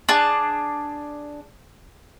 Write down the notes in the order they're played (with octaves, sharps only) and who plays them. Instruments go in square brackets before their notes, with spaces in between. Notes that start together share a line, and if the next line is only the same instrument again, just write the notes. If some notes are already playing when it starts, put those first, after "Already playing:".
[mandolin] D4 G#4 A5